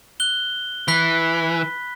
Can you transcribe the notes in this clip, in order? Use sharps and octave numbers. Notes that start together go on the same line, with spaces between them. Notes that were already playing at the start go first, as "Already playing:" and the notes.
F#6 G7
E3 B5 F#6 B6